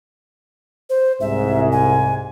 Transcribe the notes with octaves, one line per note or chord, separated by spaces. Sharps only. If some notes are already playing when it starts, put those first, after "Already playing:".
C5
C2 G#2 E5
G#5